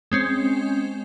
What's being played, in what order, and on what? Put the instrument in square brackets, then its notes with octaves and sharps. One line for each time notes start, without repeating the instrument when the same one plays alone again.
[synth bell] G#3 C4 C#4